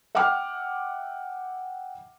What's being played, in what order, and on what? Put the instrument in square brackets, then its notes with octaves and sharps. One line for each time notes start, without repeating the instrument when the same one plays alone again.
[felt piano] E5 F#5 G5 D6 F6